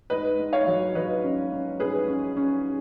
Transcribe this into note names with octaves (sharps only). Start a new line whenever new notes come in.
G#2 B4 D#5
G#2
C#5 F5
F#3
F#3 B4 D#5
C#4
C#4
G#2 G#4 B4
C#4
C#4